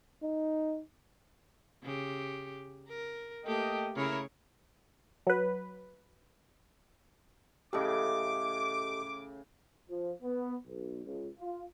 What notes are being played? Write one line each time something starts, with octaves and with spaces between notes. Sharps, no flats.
D#4
C#3 G4
A#4
A3 A#3 G4 A4 D#5 G5
C#3 E4 A#4 C#5
F#3 B4
A2 C#3 G4 A4 D#5 D6
F3
B3
B1
C#2
F4